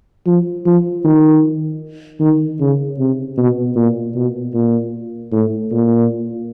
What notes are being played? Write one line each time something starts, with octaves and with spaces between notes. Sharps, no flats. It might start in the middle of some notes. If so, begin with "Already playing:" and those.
F3
F3
D#3
D#3
C#3
C3
B2
A#2
B2
A#2
A2
A#2